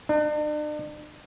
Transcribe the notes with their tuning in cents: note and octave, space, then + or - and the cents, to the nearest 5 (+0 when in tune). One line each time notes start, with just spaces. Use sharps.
D4 +40